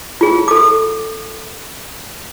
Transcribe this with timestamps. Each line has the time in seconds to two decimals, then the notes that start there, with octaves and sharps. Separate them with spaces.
0.21 F4 G#4
0.48 A4 D6